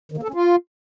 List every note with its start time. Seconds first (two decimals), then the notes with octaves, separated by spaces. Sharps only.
0.12 D#3
0.17 A#3
0.23 A4
0.28 C#4
0.34 F4